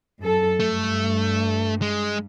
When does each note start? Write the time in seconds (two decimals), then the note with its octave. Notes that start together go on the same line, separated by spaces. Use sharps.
0.22 F#2 A4
0.60 G2 A3
1.82 G#3